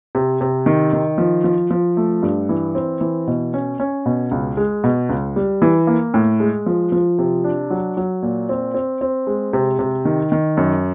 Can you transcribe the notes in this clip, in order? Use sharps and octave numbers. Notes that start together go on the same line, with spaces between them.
C3
C3
D#3
D#3
F3
F3
F3
A3
G2
E3
C4
E3
B2
C#4
C#4
B2
C#2
G#3
B2
C#2
G3
E3
A#3
A2
G#3
F3
F3
C3
D4
F#3
F#3
A#2
C4
C4
C4
G#3
C3
C3
D#3
D#3
F#2